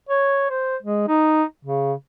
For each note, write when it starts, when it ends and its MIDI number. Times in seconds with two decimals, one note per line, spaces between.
0.09 0.47 73
0.50 0.76 72
0.83 1.04 56
1.08 1.44 63
1.65 1.93 49